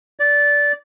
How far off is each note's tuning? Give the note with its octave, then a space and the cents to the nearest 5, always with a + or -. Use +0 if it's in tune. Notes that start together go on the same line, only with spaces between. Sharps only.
D5 -15